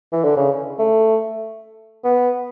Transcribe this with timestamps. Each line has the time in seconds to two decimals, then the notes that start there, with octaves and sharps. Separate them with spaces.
0.12 E3
0.24 D3
0.37 C#3
0.79 A3
2.04 B3